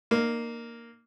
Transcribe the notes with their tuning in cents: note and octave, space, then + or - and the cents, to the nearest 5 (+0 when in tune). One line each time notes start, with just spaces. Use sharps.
A#3 +0 D#4 -35